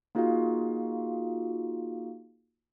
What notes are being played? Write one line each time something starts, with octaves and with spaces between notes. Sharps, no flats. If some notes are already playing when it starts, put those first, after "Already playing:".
A#3 D#4 F4 F#4 G#4 F5